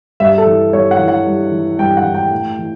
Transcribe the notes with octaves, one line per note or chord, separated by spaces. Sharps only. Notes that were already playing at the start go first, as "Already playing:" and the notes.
G2 E5
A4
E3
G2 C#5
F#5
E3
F#5
G2
E3
G2 G5
F#5
E3
G5
A2
E3